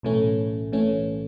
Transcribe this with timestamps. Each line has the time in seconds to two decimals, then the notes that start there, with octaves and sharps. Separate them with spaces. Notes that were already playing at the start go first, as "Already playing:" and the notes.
0.03 B1 A2 E3 A3 C#4
0.72 A2 E3 A3 C#4